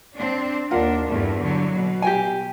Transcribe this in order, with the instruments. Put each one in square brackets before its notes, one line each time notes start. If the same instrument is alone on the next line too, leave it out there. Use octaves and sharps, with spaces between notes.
[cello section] C4 D4
[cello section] D#2 D4 [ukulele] F4 A#4 F#5
[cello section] E2 G2 A3
D3 F#3
B2
[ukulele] G4 G5 G#5